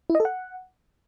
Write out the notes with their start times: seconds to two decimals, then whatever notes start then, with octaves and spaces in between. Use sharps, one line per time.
0.10 E4
0.15 D#5
0.20 A4
0.25 F#5